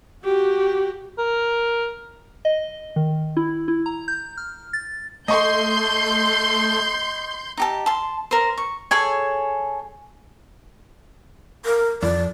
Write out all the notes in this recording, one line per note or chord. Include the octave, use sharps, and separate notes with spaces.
F#4 G4
A#4
D#5
D#3
E4
E4
A#5
G6
F6
A6
A3 D#5 C6 C#6 G6
D#4 G4 A5
A5 C6
A#4 C5
C#6
G#4 A4 C#5 G#5
A#4
F2 D5